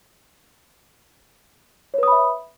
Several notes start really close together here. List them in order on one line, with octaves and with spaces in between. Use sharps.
C#5 B4 D#6 B5 E5